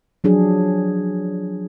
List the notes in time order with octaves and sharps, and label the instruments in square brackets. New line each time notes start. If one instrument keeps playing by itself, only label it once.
[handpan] F3 F#3 D4 G#4